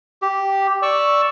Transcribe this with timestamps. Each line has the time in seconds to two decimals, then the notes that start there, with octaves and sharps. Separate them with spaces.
0.22 G4
0.83 D5 C#6 E6